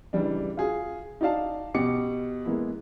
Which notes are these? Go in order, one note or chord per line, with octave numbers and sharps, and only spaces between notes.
C#2 E3 G3 D4
F4 F#4 G#4
D#4 F#4 D5 F5 A5
B2 G4 D6 C#7
G#3 A#3 B3 E4